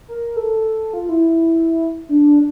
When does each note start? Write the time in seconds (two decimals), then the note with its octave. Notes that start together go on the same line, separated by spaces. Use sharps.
0.08 A#4
0.36 A4
0.94 F4
1.09 E4
2.09 D4